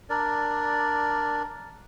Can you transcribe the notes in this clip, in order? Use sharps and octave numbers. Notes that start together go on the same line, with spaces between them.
D4 A#4 D5